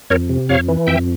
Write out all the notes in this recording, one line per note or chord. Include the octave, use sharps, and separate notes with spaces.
F2 A#4 C#5
C3
F2 C#5 F5
E3
F2 E5 G5